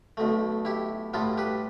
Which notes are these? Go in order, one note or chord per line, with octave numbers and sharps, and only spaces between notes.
B1 B2 A3
E4 G4
A2 G3 B3 F4 A4
G4 B4